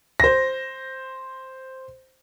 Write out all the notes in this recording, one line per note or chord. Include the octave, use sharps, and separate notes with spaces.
C5 A#6